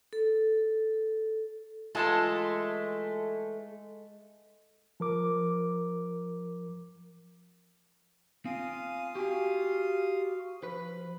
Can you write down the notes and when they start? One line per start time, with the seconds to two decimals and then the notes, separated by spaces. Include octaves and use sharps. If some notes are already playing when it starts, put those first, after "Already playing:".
0.13 A4
1.95 E3 G#3 A3 F4 A4 A5
5.00 F3 A#4 D6
8.45 C4 F4 F5 G#5 D#6
9.15 F#4 G4 G#5
10.63 F3 B4